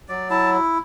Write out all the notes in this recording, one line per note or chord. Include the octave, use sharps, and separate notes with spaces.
F#3 D5
E4 A5